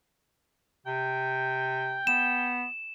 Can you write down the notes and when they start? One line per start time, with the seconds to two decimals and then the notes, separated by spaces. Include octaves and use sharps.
0.86 C3 G5
2.07 B3 E7